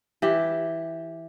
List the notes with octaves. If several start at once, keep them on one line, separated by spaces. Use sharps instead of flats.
E3 G4